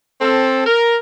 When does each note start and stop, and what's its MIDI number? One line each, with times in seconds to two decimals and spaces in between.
0.21 0.66 60
0.21 0.66 69
0.66 0.96 70